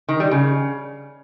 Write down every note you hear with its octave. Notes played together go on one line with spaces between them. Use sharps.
D#3
G3
C#3